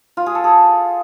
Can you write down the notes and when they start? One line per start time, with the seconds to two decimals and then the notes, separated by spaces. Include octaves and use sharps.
0.17 F4
0.26 G#4
0.35 A4
0.44 G#4